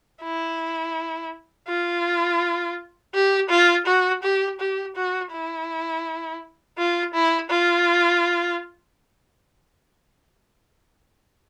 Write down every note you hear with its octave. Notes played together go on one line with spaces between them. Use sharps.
E4
F4
G4
F4
F#4
G4
G4
F#4
E4
F4
E4
F4